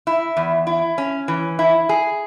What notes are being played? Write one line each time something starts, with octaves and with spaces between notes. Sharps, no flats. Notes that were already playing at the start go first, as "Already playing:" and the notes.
E4
E2
E4
C#4
E3
E4
G#4